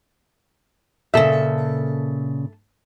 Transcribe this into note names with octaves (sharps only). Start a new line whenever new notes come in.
A#2 C#3 A4 E5